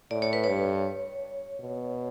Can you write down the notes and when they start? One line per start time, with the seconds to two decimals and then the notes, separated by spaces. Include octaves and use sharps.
0.11 A2 D5
0.22 C#5
0.33 B4
0.44 G2 C#5
1.60 B2